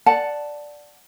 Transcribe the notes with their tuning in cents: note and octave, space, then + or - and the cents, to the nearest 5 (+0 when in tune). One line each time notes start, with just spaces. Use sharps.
D5 +0 F#5 +0 A5 +0